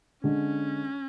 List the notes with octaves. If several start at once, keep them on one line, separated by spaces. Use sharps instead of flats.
D3 G#3 C#4 D4